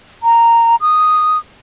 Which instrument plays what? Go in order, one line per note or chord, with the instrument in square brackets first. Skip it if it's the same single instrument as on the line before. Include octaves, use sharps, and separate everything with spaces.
[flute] A#5
D#6